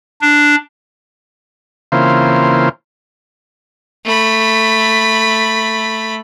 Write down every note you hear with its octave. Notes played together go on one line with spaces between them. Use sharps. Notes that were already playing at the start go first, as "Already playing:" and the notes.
D4
C#3 E3 A#3 C4 F4 C5
A3 B5